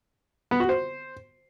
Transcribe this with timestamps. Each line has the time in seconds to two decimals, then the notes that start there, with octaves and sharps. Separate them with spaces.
0.51 B3
0.60 F#4
0.69 C5